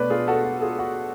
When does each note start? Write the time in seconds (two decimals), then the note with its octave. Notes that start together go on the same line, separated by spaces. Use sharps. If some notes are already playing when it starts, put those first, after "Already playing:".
Already playing: B2 A3 B4 C#5 D5
0.10 F4 G#4
0.28 F#4 A4
0.44 F#4
0.62 F4 G#4
0.79 F#4